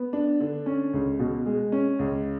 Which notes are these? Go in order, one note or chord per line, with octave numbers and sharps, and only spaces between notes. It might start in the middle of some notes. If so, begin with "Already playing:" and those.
Already playing: B3
D4
D3
C#4
C#2
B2
G#3
C#4
C#2